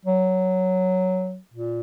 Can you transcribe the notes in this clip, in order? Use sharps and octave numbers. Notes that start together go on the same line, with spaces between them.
F#3
A#2